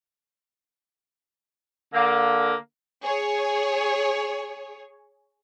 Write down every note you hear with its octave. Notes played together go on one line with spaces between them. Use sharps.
D3 A#3
G#4 C#5